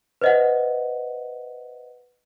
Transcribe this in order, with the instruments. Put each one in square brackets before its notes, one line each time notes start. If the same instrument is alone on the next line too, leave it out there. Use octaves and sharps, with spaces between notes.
[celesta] B4 C5 D#5 E5 F#5